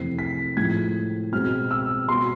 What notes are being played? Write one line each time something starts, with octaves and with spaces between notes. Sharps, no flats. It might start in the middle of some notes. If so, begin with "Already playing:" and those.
Already playing: F2 C3 E3 A3 C4 C7
B6
A2 F3 G#3 G#6
B2 G#3 C4 F6
E6
B2 B3 C6